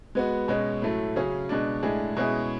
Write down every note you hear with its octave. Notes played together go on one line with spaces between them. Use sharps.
G#3 B3 F#4
B2 G#3 C#4
A2 F#3 A3
C#3 F#3 C#4 G#4
B2 G#3 D4
A2 G#3 D4 G#4
B2 G#3 C#4 E4 G#4